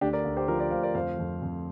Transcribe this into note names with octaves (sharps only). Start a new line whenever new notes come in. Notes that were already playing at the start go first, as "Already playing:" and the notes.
D2 D4 G4
A#4 D5
D2
G4 C5
F3 F4 A#4
A#4 D5
D2 C5 F5
A#4 D5
F2 C5 F5
F2
F2